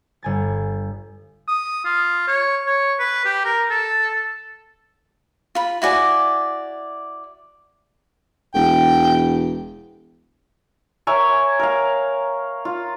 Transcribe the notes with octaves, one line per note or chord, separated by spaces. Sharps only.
G1 G#5 A6
D#6
F4
C#5
C#5
B4
G4
A#4
A4
F4 B5
E4 F#4 D5 G#5
E1 G5
A#4 C#5 E5 G#5
A#4 F5
F4